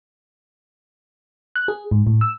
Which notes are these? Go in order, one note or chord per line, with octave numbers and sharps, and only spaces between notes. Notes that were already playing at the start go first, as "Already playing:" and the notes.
F#6
G#4
G#2
A2
E6